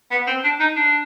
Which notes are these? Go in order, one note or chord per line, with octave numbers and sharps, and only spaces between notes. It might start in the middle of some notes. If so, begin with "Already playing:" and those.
B3
C4
D4
D#4
D4